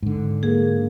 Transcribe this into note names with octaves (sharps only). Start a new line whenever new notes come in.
G#2 D3
A#3 G#4